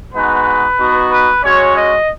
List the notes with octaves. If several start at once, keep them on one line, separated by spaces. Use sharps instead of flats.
G#3 B3 D#4 F#4 B4
B3 D#4 F#4
B4
G#3 C#4 F#4 C#5
D#5